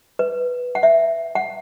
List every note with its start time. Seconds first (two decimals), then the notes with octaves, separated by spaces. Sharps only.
0.19 B4
0.75 F#5
0.83 E5
1.35 F#5